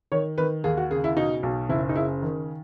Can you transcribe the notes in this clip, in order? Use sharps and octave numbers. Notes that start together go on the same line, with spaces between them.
D#3 C#5
D#3 B4
D#2 G#4
F#4
C#3 G#4
E4
B2 D#4
B1
F#1 E4
D#4
C#3 E4
D#3